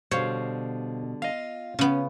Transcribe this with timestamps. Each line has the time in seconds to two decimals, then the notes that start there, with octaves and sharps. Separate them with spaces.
0.11 B2 D3 G3 C5 C#5 F5
1.22 F4 D#5 F5
1.79 C#3 B3 C#4